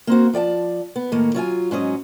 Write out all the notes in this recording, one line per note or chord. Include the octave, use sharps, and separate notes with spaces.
A#3 C4 F#4
F3 D5 G5 A5
B3
A2 D#3 A#3
F#3 F4 E5 G#5
G#2 F#3 C#4 D#5